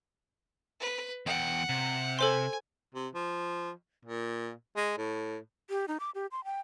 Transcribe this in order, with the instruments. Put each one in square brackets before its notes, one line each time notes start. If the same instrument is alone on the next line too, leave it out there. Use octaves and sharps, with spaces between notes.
[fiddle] B4
[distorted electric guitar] E2 G5 [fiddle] F#5
[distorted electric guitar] C3
[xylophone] A4 C5 C6 [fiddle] G#5
[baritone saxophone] C3
F3
A#2
G#3
A2
[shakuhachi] G4
D#4
D6
G4
C6
G5